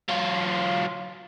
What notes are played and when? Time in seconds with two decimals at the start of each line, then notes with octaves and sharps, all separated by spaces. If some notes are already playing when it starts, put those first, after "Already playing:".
0.09 F#3 F4